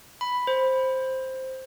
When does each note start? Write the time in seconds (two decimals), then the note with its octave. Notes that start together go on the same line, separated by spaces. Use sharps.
0.21 B5
0.47 C5